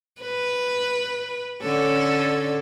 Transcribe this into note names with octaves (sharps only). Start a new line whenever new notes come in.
B4
D3 C#4 A4